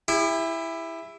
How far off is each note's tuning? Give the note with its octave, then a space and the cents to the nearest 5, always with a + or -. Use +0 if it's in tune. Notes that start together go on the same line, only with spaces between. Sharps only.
E4 +5 G4 +45